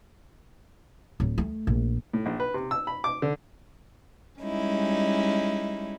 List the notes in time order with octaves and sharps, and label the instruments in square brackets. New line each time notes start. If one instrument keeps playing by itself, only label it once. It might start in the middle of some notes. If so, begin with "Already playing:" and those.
[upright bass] D1
A3
A#1
[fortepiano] A2
A#1
B4
C3
E6
B5
D6
D3
[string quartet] G3 G#3 C#4 D#4 E4